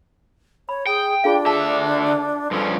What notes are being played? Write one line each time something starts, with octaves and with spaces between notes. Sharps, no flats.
C#5 B5
G#4 G5
D4 F4 G#4 F5
D3 E5 A5
G2 F3 C#4 A4